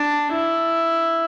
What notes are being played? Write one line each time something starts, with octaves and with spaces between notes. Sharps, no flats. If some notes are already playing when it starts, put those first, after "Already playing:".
Already playing: D4
E4